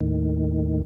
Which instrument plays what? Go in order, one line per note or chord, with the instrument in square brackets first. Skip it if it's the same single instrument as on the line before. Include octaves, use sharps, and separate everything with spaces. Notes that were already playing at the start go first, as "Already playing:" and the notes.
[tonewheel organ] D#2 A2 D#3